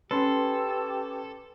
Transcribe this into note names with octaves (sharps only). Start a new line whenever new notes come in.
C#4 G4 A4 B4 C6